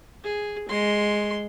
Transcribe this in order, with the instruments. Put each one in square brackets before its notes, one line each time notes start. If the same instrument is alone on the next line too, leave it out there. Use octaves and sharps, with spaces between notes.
[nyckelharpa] G#4
G#3 C6